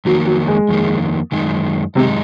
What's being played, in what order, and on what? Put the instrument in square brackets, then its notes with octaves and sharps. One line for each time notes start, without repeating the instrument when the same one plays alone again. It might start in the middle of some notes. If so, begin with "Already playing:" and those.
[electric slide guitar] F2 D#3 A#3 [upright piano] F#3
[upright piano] F#3
G#3
[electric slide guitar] F2 D#3 A#3
F#2 D#3 G#3 D#4
[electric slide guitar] F#2 D#3 G#3 D#4 [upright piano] C3